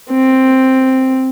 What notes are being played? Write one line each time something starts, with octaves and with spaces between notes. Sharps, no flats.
C4